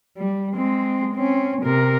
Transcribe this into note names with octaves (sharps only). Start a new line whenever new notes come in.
G3
G#3 C4
C4 C#4
C3 A#4